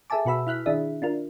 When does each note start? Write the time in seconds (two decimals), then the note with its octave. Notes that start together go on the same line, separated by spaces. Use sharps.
0.10 G#4 A4 E5 G#5 A5 D6
0.25 B2 F#4 B4 B5 E6
0.47 E4 F6 F#6 B6
0.66 D#3 D4 E4 G#4 D#5 E5
1.02 D4 F4 A#4